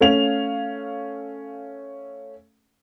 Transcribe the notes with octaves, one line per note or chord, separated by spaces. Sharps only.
A3 C#4 F5 F7